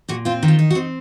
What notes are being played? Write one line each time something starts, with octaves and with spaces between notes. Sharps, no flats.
A#2 F#4
C4 F4
D#3
F4
D#4
F#4
C4